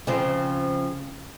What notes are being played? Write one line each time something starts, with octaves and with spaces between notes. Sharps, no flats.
C#3 F3 C4